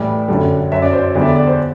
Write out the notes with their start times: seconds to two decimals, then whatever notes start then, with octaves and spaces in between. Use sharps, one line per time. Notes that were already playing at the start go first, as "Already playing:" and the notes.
Already playing: A2 E3 G3 B4
0.28 F#2 D3 G3 A4
0.72 F#2 F#3 E5
0.82 D5
0.93 C5
1.04 D5
1.15 E2 D3 G3 D5
1.22 E5
1.25 D5
1.36 D5
1.47 C5